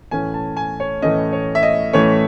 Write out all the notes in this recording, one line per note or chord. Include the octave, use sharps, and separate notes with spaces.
A2 E3 A3 C#4 G#5
A5
G#5
C#5
A2 E3 A3 C#4 D#5
C#5
E5
D#5
A2 E3 A3 C#4 C#5